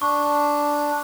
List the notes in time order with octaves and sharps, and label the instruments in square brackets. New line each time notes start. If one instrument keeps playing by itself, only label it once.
[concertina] D4 [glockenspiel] C#6